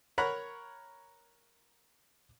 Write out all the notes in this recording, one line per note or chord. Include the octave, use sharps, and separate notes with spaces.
A#4 C#5 F#5 A#5 B5